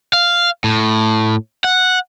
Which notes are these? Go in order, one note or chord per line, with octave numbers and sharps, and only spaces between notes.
F5
A2
F#5